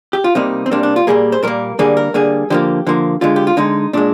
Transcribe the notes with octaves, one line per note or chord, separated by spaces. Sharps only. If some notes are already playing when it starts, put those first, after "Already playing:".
G4
F4
C3 G3 A#3 D#4
C4
C3 G3 A#3 D4
D4
F4
A#2 G3 A#3 G#4
C5
A#2 G3 A#3 A#4
D3 G3 A#3 G#4
A#4
D3 G3 A#3 G#4
D3 F3 A#3 G4
D3 F3 A#3
D3 G#3 F4
G4
F4
D3 G#3 D#4
A#2 G#3 D4